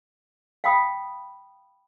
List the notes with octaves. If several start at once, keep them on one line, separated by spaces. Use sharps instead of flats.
F5 G5 B5 D#6